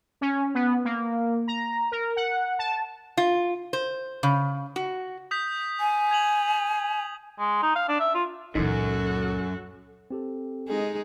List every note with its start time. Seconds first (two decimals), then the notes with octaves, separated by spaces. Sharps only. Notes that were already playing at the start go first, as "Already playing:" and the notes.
0.21 C#4
0.54 B3
0.85 A#3
1.48 A#5
1.92 A#4
2.16 F#5
2.59 A5
3.17 F4
3.73 C5
4.23 C#3
4.76 F#4
5.31 D#6 G6 B6
5.80 G#5
6.11 G#6 F7 F#7
7.39 G#3
7.63 D#4
7.76 F5
7.89 D4
8.00 E5
8.15 F4
8.55 C#2 F#2 A#2 E3 D#4 F#4 A4
10.11 C4 G4 A4
10.68 G#3 D#4 G#4